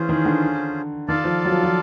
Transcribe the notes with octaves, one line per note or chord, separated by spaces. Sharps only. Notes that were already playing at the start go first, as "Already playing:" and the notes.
Already playing: E3 C#4 F4 G#4 C5
D#3
D3
D#3 F4 A4 D5 F5 A5
F3
F#3
F3
F3